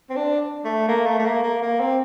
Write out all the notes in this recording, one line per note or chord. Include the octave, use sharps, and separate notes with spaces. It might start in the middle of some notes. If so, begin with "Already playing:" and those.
C4
D4
A3
A#3
A3
A3
A#3
A#3
A#3
C4